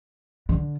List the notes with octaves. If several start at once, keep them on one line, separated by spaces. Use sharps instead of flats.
D3